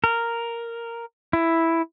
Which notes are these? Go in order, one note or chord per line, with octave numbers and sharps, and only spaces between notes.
A#4
E4